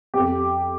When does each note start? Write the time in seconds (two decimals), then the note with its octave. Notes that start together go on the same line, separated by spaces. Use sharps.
0.14 F2 G4